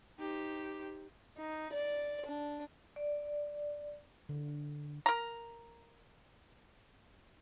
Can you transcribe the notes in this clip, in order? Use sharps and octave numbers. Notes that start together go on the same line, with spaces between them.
D#4 G4 C5
D#4
D5
D4
D5
D3
A#4 A#5